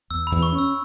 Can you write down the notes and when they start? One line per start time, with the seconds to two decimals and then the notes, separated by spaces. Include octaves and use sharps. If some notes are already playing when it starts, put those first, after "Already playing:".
0.10 E2 E6
0.27 B5
0.32 E2
0.43 C#6
0.53 C#4
0.58 E6